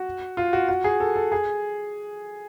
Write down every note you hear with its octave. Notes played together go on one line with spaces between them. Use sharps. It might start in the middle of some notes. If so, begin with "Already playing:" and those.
Already playing: F#4
F4
F#4
F#4
G#4
A4
A4
G#4